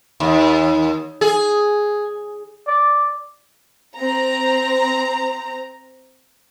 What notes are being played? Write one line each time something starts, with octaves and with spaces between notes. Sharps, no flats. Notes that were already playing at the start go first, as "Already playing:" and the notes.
D#2
G#4
D5
C4 A#5